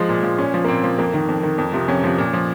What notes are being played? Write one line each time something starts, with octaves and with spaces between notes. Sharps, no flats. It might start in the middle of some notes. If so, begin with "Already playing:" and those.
Already playing: F3 G#3
A#2
F3
A#2 C#4
F3
A#3
A#2 C4
F3
F2 A#3
D#3
F2
D#3
F2
C3 F3
F2 C#4
C3 F3
A#2
F3